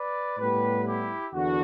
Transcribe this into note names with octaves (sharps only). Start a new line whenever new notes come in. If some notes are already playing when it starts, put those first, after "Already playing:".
Already playing: B4 D5
A2 G3 B3 G4 B4
E4 G4
E2 D3 D4 F#4